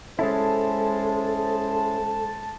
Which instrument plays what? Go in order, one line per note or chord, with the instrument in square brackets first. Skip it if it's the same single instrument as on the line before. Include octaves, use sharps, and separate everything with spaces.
[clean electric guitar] G#3 C#4 E4 [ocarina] A4 [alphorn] C5 [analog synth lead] A5